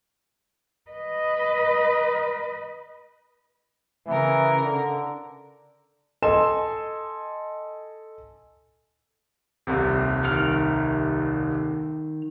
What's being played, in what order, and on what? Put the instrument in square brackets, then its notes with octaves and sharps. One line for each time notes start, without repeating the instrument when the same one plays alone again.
[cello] B4 D#5
[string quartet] C#3 A#4 [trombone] E3
[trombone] D3
[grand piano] A4 D#5 G#5 C6 E7
D#1 C2 C3
[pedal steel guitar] D#3 F6